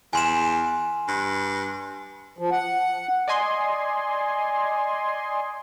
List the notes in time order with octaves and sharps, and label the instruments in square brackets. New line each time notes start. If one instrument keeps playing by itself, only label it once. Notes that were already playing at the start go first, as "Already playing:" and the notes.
[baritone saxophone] E2 [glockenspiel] G#5 C6 E7
[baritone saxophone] G2
[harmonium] F3
F#5
[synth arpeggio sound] D5 D#5 G#5 C6